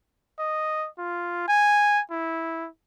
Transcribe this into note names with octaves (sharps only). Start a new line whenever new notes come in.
D#5
F4
G#5
E4